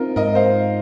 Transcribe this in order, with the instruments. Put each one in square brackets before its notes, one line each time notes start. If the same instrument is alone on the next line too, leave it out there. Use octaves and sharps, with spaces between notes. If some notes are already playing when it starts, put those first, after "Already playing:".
Already playing: [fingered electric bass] C4 [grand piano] D#4 F4 A#4
[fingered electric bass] G#2 [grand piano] A#4 D#5
[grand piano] C5 F5